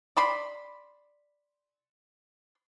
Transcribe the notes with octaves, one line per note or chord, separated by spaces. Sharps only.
D5 B5 C6